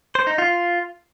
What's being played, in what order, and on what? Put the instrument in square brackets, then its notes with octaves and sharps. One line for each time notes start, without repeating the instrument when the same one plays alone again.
[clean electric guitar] C5
D#4
F4